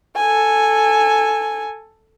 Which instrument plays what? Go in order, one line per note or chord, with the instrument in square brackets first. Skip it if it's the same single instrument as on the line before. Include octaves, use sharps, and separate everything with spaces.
[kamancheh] A4 G#5